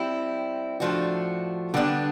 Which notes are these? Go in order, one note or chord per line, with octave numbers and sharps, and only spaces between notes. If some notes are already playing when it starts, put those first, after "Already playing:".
Already playing: G3 C4 E4
A2 F3 A3 D4 F#4
D3 G3 B3 D4